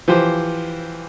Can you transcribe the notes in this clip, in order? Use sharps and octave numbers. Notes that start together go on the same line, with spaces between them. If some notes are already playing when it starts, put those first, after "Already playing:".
E3 F3 G4 C5